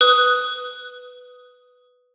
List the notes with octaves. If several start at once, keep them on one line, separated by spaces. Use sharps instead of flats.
B4 D#6 F#6